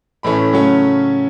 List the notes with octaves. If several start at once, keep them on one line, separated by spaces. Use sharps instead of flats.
A2 E3 A3 C#4 B5
C#3 F#3 A3 C#4